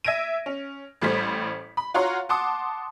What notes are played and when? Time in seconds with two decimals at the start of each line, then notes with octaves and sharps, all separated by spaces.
0.04 E5 G#6 A#6 D7 D#7
0.46 C#4
1.01 A1 A2 G3 A3 C5 B6
1.77 B5
1.94 F4 F#4 C#5 F5 A#5 C6
2.29 F#5 A5 C6 D6 D#6